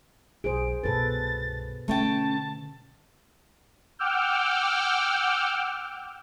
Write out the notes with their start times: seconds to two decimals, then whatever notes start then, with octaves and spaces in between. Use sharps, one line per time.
0.44 B1 E2 G#4 C5 D7
0.84 C2 G2 B2 A4 B4 A6
1.88 D3 A3 C#4 G5 A5
3.99 F#5 G5 D6 E6 F6 G6